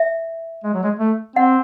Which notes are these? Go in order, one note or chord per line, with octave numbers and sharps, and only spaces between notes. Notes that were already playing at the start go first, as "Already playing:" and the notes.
Already playing: E5
G#3
F#3
G#3
A3
C4 F#5